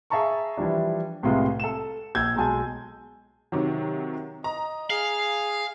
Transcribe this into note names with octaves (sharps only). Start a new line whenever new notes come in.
G#4 E5 F5 A5 A#5 C#6
E3 F3 G3 D4
C2 A2 C3 G#3 F4 B4
A4 E7
A#1 E6 G6 G#6
B1 G#3 G#5 A5
C3 D#3 F#3
D#5 A#5
G#4 F5